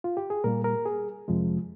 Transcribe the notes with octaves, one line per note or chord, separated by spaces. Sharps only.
F4
G4
G#4
A#2 G3 A#3 A#4
A#4
G#4
F2 C3 F3 G#3